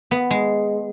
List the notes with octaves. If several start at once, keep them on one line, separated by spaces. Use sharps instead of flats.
B3
G#3